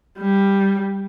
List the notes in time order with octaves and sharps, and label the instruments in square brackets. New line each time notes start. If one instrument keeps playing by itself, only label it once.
[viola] G3